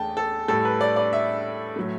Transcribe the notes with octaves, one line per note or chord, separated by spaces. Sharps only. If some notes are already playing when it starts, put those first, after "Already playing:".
Already playing: E2 A3 G5 A5
A4
A2 G3 A4
B4
D5
D5
E5
A2 F#3 A3